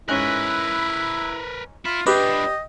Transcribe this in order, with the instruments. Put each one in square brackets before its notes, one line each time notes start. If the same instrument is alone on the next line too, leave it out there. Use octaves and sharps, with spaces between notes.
[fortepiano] G#2 C#4 [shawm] E4 [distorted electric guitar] A#4 B4 [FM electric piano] F#6
[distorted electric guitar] E4 [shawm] F4
[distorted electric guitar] D4 F4 [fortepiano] G4 D6 [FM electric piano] B4 [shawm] D#5